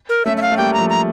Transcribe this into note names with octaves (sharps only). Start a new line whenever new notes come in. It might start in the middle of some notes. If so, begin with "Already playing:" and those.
A#4
A3 C#4 E5
E5
F5
A3
G3 A#3 G5
A#5
F3 A3
A#5